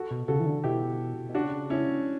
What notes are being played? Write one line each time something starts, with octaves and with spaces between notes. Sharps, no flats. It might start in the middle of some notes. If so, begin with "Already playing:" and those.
Already playing: F#4 A4
B2
C#3 F#4 A4
E3
D3
B2 E4 G4
B2
C#3 D4 F#4
C#4 E4